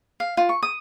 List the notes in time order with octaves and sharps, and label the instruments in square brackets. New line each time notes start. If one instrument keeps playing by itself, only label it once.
[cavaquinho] F5
F4
C#6
D#6